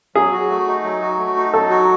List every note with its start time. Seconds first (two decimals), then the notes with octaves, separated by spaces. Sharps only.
0.15 F#3 G#4
0.32 F#4
0.50 A3
0.67 D#4
0.84 F#3
1.02 F#4
1.19 A3
1.37 D#4
1.54 F#3 A4
1.70 F#4